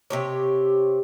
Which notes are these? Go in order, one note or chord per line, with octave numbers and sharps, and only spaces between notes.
C3 G4 C#5